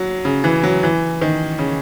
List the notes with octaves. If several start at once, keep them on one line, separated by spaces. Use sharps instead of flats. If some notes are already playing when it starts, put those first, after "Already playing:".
Already playing: F#3
C#3
E3
F#3
E3
D#3
C#3